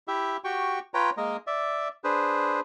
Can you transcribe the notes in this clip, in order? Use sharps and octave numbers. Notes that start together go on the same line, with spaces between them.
E4 G4 E5
F#4 G4 G5 C#6
F4 B4 C#5 G5 A#5
G#3 A#3 A#4 D#5
D5 E5
D4 G#4 B4 C5